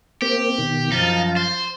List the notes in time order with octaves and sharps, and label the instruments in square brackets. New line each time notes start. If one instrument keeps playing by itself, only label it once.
[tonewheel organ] A#3 C4 [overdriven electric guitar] G4
[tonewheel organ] B2 D#3
[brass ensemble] F#2 F3 [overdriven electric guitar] D#4 [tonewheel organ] F5 A5 A6
[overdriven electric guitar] C5